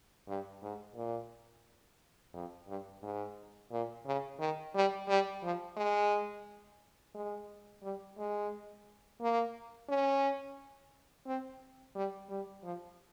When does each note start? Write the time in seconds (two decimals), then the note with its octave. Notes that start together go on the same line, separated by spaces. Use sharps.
0.28 G2
0.62 G#2
0.96 A#2
2.34 F2
2.68 G2
3.02 G#2
3.71 A#2
4.06 C#3
4.39 D#3
4.75 G3
5.09 G3
5.43 F3
5.77 G#3
7.15 G#3
7.83 G3
8.18 G#3
9.21 A#3
9.89 C#4
11.27 C4
11.96 G3
12.30 G3
12.64 F3